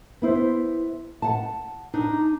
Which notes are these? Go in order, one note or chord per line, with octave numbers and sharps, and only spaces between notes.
B3 E4 C5
F#5 A5
D4 D#4